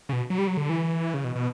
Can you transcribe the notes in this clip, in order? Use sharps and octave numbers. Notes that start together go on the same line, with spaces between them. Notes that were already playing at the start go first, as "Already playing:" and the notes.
C#3
B2
F#3
G3
F#3
D3
E3
C#3
B2
B2